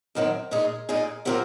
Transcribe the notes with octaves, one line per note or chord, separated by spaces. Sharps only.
F#2 D#3 F#3 C4
A#2 G#3 D#4 G#4
A#2 G#3 D#4 G#4
C3 F#3 C4 F4 A#4